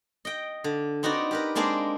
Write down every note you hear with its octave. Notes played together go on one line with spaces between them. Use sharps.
D#5 G5
D3
C4 D#4 F#4 B4 D5
G4 A#4 B4
G#3 A#3 C4 D4 G#4 C5